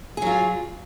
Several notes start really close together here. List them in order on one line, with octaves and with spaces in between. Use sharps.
G#4 F#3 F4